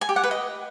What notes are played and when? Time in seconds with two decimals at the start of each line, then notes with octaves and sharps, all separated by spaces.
0.01 G#5
0.09 G4
0.16 F#5
0.24 B4
0.31 D#5